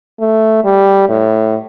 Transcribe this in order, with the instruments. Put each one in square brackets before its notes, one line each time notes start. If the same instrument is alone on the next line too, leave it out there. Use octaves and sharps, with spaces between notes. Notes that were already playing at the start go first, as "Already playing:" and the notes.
[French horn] A3
G3
A2